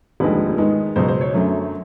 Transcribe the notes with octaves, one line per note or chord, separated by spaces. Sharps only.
F1 D#2 D3 F3 G#3 B4
G#2 D#3 G#3 B3
C#2 B2 F#3 C5
C5
C#5
F#2 D3 F#3 A3